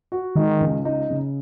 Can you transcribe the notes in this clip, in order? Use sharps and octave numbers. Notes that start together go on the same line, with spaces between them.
F#4
D#3 G#3
C#2
D#4
C#3